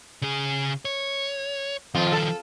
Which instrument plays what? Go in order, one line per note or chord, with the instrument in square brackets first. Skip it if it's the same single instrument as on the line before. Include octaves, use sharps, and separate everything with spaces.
[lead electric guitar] C#3 G#4
C#5
[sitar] F2 F4 [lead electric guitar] D#3 F3
[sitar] A4